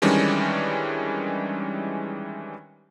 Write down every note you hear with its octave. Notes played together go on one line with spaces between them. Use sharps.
D#3 E3 G3 G#3 C#4 D4